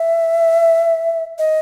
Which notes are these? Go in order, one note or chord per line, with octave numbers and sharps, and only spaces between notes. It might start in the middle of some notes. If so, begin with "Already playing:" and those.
Already playing: E5
D#5